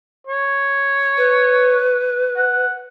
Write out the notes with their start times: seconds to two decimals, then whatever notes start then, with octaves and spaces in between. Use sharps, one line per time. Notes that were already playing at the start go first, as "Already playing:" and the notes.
0.27 C#5
1.17 B4
2.36 F#5